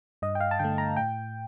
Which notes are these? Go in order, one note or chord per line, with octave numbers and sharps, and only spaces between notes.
G2 D#5
G5
F5
A5
D3 A3 G5
A#5
A2 G5